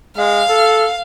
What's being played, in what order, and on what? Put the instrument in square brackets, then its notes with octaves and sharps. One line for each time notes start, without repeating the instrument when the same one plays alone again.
[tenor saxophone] G#3 [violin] F5
[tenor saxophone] A4